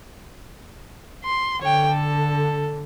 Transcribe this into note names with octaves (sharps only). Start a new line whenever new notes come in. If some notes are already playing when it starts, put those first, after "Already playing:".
C6
D3 C#5 G5
A4